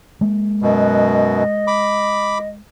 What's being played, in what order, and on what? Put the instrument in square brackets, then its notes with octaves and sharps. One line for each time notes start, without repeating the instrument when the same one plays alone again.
[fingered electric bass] G#3 A#3
[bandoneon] F#2 B2 [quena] D#5
[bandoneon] B5 D6